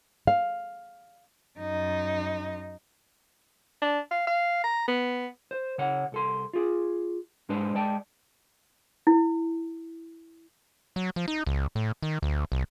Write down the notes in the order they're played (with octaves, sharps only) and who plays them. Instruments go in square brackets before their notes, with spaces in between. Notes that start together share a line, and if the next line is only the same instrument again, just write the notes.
[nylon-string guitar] F5
[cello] F#2 D#4
[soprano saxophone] D4
F5
F5
A#5
B3
[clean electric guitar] C5
C#3 C#5 F#5
C2 A4 C6
F4 G#4
G#2 G#3 D4 B4 C5
G#3 D5 G5 A5
[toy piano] E4
[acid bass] F#3
F3
D#4
C#2
A2
D#3
D2
C2